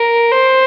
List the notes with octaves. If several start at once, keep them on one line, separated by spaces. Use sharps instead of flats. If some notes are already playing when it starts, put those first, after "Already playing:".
Already playing: A#4
C5